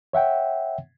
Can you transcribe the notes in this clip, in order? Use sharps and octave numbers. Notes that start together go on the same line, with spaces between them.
C#5 E5 F#5 G5